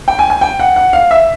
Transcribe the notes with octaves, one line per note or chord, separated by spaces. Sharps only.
G5
G#5
G#5
G5
F#5
F#5
F5
E5